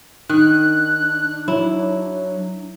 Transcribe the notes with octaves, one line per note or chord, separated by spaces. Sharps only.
D#3 D4 F#6
F#3 E4